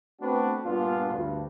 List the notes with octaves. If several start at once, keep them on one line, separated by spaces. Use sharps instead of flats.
A3 B3 C4 D4 F#4 B4
G2 A#2 B3 D4 F4
D2 G2